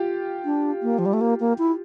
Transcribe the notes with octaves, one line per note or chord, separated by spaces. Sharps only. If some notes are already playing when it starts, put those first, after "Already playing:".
Already playing: F4 G4
D4
A#3
F3
G3
A3
A#3
A#3
E4